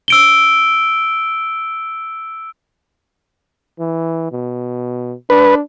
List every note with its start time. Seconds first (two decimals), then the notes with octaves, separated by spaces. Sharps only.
0.08 E6 D7 G7
3.80 E3
4.32 B2
5.30 D4 B4